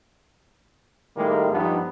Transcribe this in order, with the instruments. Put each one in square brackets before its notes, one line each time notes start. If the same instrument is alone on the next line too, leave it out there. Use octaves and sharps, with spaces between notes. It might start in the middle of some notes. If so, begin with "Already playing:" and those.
[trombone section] A2 D#3 G3 G#3 A#3
G2 F3 B3 D4 D#4